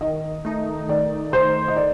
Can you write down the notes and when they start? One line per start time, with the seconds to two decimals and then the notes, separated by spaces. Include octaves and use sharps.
0.01 D#3 D#5
0.45 A3 D#4
0.89 D#3 D5
1.32 A3 D#4 C5
1.68 D#5
1.76 D5